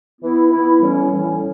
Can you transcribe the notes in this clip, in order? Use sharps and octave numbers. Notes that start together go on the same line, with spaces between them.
E3 B3 E4
E3 B3 E4
A2 E3 G3 C#4
A2 E3 G3 C#4